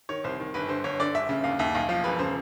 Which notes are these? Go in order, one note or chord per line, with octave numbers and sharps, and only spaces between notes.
D#3 C#5
C2 C5
D#3
G1 B4
D3 C5
G1 C#5
D3 D5
G1 E5
C#3
D#2 F5
D#2 E5
B1 F5
F3 F5
E1 B4
C#3 C5